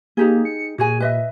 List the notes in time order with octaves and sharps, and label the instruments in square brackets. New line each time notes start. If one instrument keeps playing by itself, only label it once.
[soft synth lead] A#3 [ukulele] D#4 G4 G#4
[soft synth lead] C#7
[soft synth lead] A#2 [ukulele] F#4 G#4 G#5
[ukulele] B4 D#5 E5